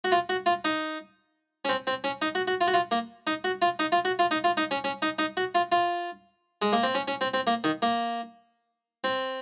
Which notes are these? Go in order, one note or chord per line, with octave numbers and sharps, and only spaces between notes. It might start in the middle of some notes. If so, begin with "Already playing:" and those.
F#4
F4
F#4
F4
D#4
C#4
C4
C4
C#4
D#4
F#4
F#4
F4
F#4
F4
A#3
D#4
F#4
F4
D#4
F4
F#4
F4
D#4
F4
D#4
C#4
C#4
D#4
D#4
F#4
F4
F4
G#3
A#3
C4
C#4
C#4
C4
C4
A#3
D#3
A#3
C4